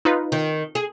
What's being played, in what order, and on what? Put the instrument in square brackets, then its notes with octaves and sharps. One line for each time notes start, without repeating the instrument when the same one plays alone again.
[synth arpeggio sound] D#4 F4 B4
[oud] D#3
G#4